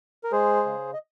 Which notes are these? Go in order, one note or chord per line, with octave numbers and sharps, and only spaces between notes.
A#4
G#3 G#4 C5
C#3
D#5